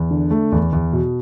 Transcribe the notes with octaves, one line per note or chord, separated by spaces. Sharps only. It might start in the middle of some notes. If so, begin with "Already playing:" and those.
Already playing: E2
D3
A3
E2
E2
B2